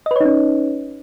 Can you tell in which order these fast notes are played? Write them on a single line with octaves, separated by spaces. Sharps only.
D#5 B4 C#5 D#4 C#4